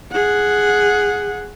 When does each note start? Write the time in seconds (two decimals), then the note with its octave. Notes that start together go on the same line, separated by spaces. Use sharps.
0.12 G#4 F#5